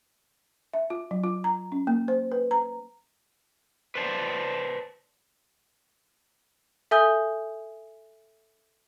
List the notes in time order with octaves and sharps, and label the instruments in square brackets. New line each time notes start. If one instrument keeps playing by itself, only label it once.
[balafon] E5
F4
F#3
F4
A#5
C#4
A#3
C5
B4
A#5
[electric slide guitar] B4 C5 D5 A5
[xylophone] A4 E5 G#5 D#6 G6 G7